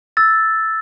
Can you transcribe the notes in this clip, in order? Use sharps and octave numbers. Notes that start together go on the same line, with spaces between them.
E6 A6